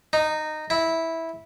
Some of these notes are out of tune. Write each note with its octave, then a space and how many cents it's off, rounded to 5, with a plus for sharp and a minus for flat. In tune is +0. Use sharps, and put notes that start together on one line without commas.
D#4 -15
E4 -10